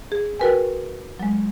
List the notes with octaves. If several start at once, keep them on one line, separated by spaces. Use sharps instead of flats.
G#4
F#4 A#4 B4 G5 G#5
F#3 G#3